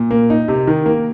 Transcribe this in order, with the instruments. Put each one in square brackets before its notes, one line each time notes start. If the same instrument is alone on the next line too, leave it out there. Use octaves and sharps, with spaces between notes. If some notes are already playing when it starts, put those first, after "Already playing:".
Already playing: [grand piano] A#2
A#3
D#4
C3
D#3
A#3